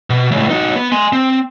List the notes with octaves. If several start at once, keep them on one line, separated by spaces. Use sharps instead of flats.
B2
C#2 A2
D#4 F#4
B3
G#5 C6
C4